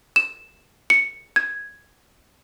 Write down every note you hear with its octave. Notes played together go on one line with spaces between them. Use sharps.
E7
C#7
G#6